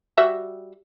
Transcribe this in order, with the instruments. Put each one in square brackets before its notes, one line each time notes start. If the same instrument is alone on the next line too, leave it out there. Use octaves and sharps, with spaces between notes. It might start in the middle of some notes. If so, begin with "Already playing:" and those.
[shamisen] G3 F#4 E5